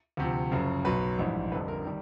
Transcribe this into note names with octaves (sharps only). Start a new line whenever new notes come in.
D2 C3 F3
F#1 F#2 C#3 F3
B1 B2 F#3 B4
A#1 G#2 E3 G3
F1 F2 D3 G3 B4
A#4
D#3 G3